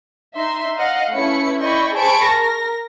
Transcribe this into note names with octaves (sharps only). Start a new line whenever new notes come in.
D#4 E5 C6
D#5 F5 F#5
A3 C#4 E4 B4 B5 C#7
E4 D5 D#5 G5 B5 C#6
G#4 C5 A5 B5 C#6 D7
A#4 A#6